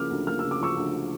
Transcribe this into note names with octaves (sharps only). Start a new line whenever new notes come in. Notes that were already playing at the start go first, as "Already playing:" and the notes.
Already playing: C#3 F3 A#3 D6 F6
D2
A#3 F6
C#3 E6
D6
F3 C#6 E6
D2